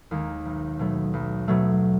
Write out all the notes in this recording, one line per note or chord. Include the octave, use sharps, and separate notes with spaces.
D#2 D#3 G#3
B1
B2 F#3 A3
B1
B2 F#3 A3